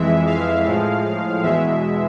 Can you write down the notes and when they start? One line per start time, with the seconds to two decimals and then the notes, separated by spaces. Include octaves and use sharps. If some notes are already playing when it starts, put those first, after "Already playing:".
Already playing: F2 E3 G#3 E5
0.27 F5
0.66 A2 F3 G#3
1.43 E2 B2 G#3 E5